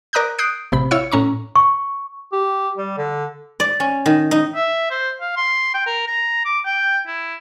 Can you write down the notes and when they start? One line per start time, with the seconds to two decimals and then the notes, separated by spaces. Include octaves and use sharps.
0.13 A#4 D5 A#5 D#6 F#6 G6
0.38 D#6 F#6 G6 C7 D7
0.72 A1 C3 B5
0.91 E4 C#5 F5 E6 F6 C#7
1.11 A2 C#4 A#5 C#6
1.56 C#6
2.32 G4
2.78 G3
2.98 D3
3.60 D5
3.80 C#4
4.06 D#3
4.31 D#4
4.56 E5
4.91 C5
5.21 F5
5.37 C6
5.74 G5
5.87 A#4
6.07 A#5
6.45 D6
6.65 G5
7.07 E4